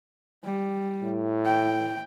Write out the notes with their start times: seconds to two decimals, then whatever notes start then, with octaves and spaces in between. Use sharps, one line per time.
0.44 G3
1.03 A2
1.45 G5